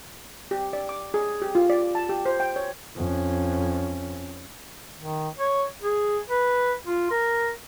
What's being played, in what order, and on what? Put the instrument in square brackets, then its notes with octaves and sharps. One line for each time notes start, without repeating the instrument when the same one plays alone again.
[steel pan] G4
D5
D6
G#4
G4
F4
D5
A5
G4
C5
G5
C#5
[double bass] F2 C#4
[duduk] D#3
C#5
G#4
B4
F4
A#4